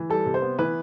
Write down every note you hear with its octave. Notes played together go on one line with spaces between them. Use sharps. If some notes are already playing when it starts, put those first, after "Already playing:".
Already playing: E3
G3 A4
C3
C5
B3
E3 B4